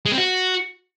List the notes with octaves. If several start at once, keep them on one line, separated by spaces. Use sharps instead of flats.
G#3
C4
F#4